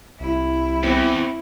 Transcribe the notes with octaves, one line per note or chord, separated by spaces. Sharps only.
C2 E4
E2 C4